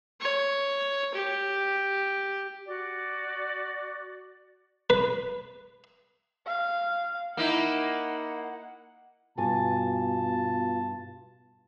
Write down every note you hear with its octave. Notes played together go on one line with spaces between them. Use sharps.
C#5
G4
F#4 D5 D6
B4
F5
A#3 D#4 E4 F#5
G2 B2 F4 G#5 A5